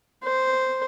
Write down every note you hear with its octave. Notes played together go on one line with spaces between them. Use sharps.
C5